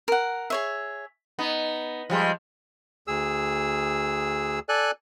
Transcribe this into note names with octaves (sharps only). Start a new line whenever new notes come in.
A#4 F#5
G#4 C#5 E5
B3 D#4
F3 G3 G#3
D2 G#4 E6
A4 D5 G#5 F#6